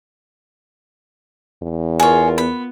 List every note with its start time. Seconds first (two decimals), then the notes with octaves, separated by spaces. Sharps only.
1.62 E2
2.00 F4 G#4 A#4 C#5
2.38 B3 B5